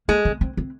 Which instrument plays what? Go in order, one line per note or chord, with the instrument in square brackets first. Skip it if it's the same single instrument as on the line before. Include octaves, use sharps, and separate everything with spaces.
[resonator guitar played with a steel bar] G#3 [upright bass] A#3
[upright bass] C4
C4
C4